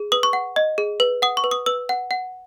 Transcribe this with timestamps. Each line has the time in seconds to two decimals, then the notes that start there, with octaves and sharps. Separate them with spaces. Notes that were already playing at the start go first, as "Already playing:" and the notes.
Already playing: G#4
0.12 B4 D#6
0.23 C#6
0.33 F#5
0.56 D#5
0.78 G#4
1.00 B4
1.22 F#5 D#6
1.37 C#6
1.44 B4
1.51 D#6
1.66 B4 E6
1.89 F#5
2.11 F#5